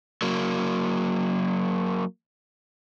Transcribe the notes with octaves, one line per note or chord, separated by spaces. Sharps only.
F#3 A#3